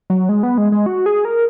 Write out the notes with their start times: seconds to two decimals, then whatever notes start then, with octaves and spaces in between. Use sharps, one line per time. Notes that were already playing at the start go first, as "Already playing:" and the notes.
0.10 F#3
0.29 G#3
0.43 B3
0.58 G#3
0.72 G#3
0.86 F#4
1.06 G#4
1.25 A#4